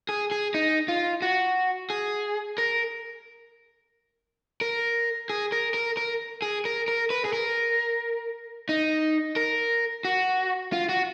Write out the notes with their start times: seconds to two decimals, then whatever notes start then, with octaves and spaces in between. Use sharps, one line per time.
0.09 G#4
0.31 G#4
0.54 D#4
0.88 F4
1.22 F#4
1.90 G#4
2.58 A#4
4.61 A#4
5.30 G#4
5.52 A#4
5.74 A#4
5.97 A#4
6.42 G#4
6.65 A#4
6.88 A#4
7.10 B4
7.25 G#4
7.33 A#4
8.69 D#4
9.36 A#4
10.05 F#4
10.72 F4
10.89 F#4